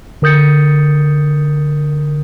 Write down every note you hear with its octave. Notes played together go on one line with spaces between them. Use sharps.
D3 A#4 D#6 G6 A6 C#7